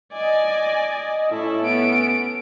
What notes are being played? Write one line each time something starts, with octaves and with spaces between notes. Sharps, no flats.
D5 D#5 G#5
A2 C#4 E4 A4
B3 D7